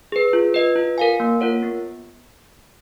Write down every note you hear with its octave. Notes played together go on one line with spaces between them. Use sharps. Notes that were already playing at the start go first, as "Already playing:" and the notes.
G#4 B4
F4
B4 D#5
F4
A#4 F5 G#5
A#3
F4 A#4 C#5 F#5
B3